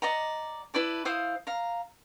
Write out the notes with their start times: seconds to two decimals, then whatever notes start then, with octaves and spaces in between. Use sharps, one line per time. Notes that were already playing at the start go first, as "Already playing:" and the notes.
0.02 D5 D#5 F#5 A#5
0.74 E4 B4 D5 A5
1.05 E4 C5 F5 D#6
1.47 F5 A#5